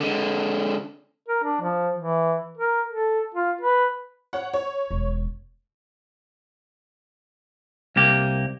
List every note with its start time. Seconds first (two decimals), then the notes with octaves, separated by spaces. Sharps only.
0.01 D3 G#3
1.28 A#4
1.44 D4
1.61 F3
1.98 E3
2.58 A#4
2.89 A4
3.35 F4
3.61 B4
4.33 C#5 F#5
4.54 C#5
4.91 E1
7.96 C2 A#3 G4